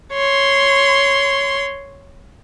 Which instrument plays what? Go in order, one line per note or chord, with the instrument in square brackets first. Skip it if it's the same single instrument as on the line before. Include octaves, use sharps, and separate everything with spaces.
[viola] C#5 C6